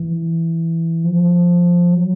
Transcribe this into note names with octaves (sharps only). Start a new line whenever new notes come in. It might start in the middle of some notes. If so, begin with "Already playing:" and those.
Already playing: E3
F3
F#3